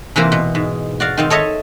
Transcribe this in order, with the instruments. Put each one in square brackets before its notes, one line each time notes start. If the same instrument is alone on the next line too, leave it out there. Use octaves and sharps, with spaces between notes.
[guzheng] C3 E3 A#3 C5
B2
G#2
F#4 D5 F5
D#3 C4 F5
A4 C#5 D#5 E5 A5